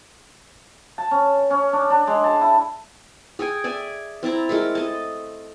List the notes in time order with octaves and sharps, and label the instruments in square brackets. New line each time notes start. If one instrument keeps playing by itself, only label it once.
[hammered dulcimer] A5
C#4
C#4
D4
D4
G#3
A5
E4
[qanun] G#4 A4 G5 G#5
D5 E5 G#5
C4 E4 A5 A#5
G#3 A3 A4 A#4
D#5 A5